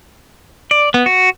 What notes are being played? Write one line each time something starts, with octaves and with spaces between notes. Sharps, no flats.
D5
B3
F#4